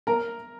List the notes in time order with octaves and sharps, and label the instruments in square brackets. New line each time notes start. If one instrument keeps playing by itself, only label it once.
[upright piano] A#4 A#5